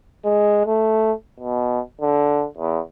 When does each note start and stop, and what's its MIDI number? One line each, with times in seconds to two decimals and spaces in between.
0.25 0.62 56
0.66 1.12 57
1.40 1.80 47
2.01 2.45 50
2.57 2.80 40